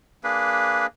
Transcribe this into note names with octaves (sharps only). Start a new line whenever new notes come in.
A#3 D4 G#4 B4